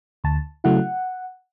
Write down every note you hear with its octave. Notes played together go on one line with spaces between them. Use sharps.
D2 A5
C#3 F#3 A3 E4 F#5